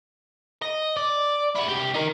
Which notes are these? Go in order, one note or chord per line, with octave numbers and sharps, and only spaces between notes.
D#5
D5
E4 F#4
C2 G4
D#4 A#4